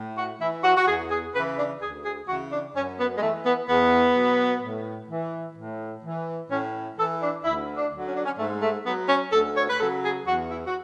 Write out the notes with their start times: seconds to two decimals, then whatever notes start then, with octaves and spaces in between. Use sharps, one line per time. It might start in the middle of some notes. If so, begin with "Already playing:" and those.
Already playing: A2
0.17 F#4
0.40 E3 E4
0.64 F#4
0.76 F#4
0.87 E2 G#4
1.10 G#4
1.34 C#3 E3 B4
1.58 D4
1.81 D2 G#4
2.04 G#4
2.28 C#3 E3 F#4
2.52 D4
2.75 F#2 C#4
2.99 B3
3.17 G#3
3.22 E3 A3
3.45 B3
3.69 E2 B3
4.16 B2 F#3
4.63 A2
5.09 E3
5.57 A2
6.04 E3
6.50 A2 C#4
6.97 E3 A4
7.21 D4
7.44 D2 E4
7.76 D4
7.91 D3 F#3
8.07 C#4
8.16 D4
8.25 C#4
8.38 G#2 A3
8.62 A3
8.85 F#3 B3
9.09 C#4
9.32 D2 A4
9.56 C#5
9.68 B4
9.79 C#3 F#3 A4
10.03 G#4
10.26 E2 F#4
10.50 E4
10.66 F#4